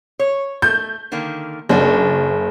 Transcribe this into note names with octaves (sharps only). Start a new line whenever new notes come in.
C#5
A3 G6
D3 D#3 A#3
F#1 C#4 D4 F#4